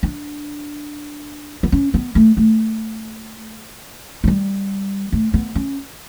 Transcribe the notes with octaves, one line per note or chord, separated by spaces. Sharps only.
D4
B3
C#4
B3
A3
A3
F#3
G3
A3
B3
C#4